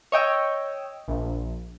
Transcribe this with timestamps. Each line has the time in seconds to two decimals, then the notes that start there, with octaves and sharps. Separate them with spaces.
0.12 C#5 D#5 G5 E6
1.08 A#1